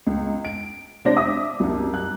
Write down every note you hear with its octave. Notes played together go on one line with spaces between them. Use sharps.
C#2
D7
C3 G#3 D4 C5 D5 A#6
E5 D6 D#6
C2 F#2
F#6